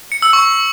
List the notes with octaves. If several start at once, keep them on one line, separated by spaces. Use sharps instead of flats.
C#7
E6
C#6